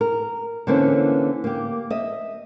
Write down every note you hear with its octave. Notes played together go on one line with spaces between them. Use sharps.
A#4
D3 E3 A#3 C4 C#4
A#3 G4
D#5 E5